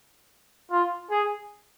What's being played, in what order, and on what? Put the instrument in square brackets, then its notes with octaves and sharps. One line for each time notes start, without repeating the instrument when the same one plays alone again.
[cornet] F4
G#4